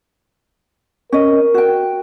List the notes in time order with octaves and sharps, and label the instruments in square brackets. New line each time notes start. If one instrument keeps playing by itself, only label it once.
[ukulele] C#4 D#5 [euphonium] A#4
[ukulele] F#4 G5